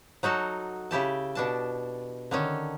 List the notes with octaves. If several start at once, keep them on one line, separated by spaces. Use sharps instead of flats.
F#3 D#4 F#4 A4
C#3 E4 G4 A5
B2 D4 A5
D3 D#3 C#4 A4